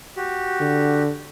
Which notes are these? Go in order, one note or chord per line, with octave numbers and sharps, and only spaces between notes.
F#4 G4
D3